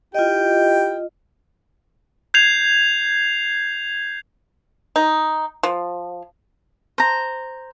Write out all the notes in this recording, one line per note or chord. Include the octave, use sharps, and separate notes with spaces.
E4 F4 G4 D#5 G5
G6 G#6 C7 F7
D#4
F3
C5 A#5